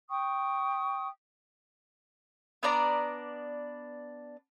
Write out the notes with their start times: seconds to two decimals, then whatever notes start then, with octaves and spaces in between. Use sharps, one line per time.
0.10 G5 C#6 D#6
2.63 B3 D4 D5 A#5